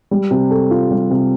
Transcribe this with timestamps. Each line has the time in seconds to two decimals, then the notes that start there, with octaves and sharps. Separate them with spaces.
0.11 G3
0.31 C3
0.51 A4
0.71 F4
0.91 G3
1.10 C3